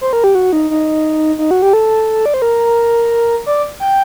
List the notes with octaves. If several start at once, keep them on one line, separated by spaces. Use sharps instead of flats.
C5
A#4
G4
F#4
D#4
D#4
D#4
F#4
G4
A4
D5
C5
A#4
D5
G5